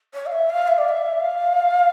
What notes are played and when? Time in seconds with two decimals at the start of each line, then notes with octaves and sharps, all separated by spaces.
0.14 C#5
0.26 F5
0.32 E5
0.49 F5
0.67 E5
0.78 D5
0.88 E5
1.19 F5